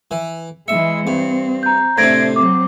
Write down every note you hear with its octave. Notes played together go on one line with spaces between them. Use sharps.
E3
E3 G#3 E5 C#7
G2 C4
A#5 G6
A2 C3 D4 C5 G#6 A#6 D7
F#3 C4 D6